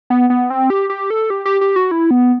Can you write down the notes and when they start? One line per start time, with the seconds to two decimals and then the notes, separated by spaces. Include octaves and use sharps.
0.10 B3
0.30 B3
0.50 C4
0.70 G4
0.90 G4
1.10 A4
1.30 G4
1.45 G4
1.61 G4
1.76 F#4
1.91 E4
2.11 B3